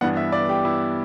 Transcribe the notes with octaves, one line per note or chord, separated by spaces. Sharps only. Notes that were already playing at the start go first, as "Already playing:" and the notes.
G2 E3 B3 D4 F#5
E5
D5
G4
E4